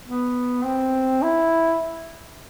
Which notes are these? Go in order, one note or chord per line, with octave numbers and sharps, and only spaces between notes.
B3
C4
E4